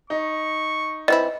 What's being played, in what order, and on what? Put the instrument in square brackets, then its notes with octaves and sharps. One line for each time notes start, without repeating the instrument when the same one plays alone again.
[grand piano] D#4 [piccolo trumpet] C#6
[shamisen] E3 C4 E4 [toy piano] D#5